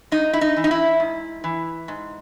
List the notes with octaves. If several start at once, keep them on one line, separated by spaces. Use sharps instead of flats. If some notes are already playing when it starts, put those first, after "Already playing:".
G#2 D#4
E4
D#4
E3
D#4
E4
G#2
E3
G#2